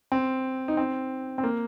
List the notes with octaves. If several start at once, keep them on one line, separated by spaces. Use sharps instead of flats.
C4
D#4
C4
C4
A#3